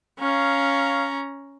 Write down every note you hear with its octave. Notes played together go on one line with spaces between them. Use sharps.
C#4 C#5 F5 A#5